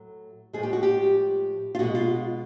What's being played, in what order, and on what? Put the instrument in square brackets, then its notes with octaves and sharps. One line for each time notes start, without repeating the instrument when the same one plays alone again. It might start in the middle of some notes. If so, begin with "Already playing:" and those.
Already playing: [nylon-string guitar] A2 F#3 A3
A2 F3 G#3 G#4
G4
F#4
G4
F4
B2 G#3 F#4
F4